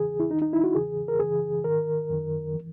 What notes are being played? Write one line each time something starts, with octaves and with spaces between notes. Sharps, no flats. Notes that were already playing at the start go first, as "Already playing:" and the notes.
Already playing: E2 C#3 E3 G#4
E4
D#2 D#3 D#4
D#4
E4
F#4
E2 C#3 E3 G#4
A#4
F#2 C#3 E3 G#4
G#2 D#3 A#4
F#2 D#3
E3